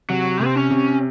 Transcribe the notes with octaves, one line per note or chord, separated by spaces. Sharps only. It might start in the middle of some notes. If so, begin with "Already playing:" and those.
C3 F#3
C3 C4
C#4
C3